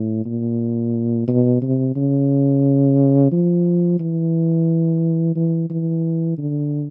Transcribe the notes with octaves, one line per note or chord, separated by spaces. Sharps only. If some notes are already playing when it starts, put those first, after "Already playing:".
Already playing: A2
A#2
B2
C3
C#3
F3
E3
E3
E3
D3